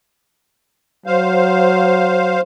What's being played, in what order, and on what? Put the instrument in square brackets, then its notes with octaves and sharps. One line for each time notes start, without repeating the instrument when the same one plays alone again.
[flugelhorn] F#3 [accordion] C5 F5